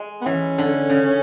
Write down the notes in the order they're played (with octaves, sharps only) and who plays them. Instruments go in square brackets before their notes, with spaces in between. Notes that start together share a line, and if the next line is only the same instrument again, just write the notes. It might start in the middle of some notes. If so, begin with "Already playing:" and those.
Already playing: [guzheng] G#3
[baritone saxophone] B3
[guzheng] E3 [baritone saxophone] C#4
[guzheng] D3
C#3